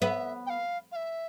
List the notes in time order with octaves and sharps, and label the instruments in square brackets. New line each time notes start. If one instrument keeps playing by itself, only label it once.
[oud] B3 [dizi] E5
[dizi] G5
F5
F5
E5